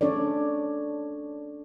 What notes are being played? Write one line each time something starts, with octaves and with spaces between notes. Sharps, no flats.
C#4 D4 A4 C#5 D5